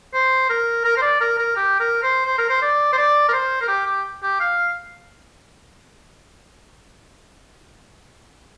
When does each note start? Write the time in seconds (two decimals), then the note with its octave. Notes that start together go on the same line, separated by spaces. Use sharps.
0.14 C5
0.50 A#4
0.85 A#4
0.97 C5
1.02 D5
1.21 A#4
1.38 A#4
1.56 G4
1.80 A#4
2.03 C5
2.26 C5
2.38 A#4
2.49 C5
2.62 D5
2.93 C5
2.98 D5
3.29 A#4
3.33 C5
3.61 A#4
3.68 G4
3.86 G4
4.23 G4
4.40 F5